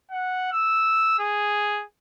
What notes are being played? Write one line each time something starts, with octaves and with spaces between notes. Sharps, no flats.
F#5
E6
G#4